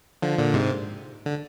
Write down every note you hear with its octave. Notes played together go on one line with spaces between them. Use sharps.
D3 F3
A#2 D3
G#2 C3
D3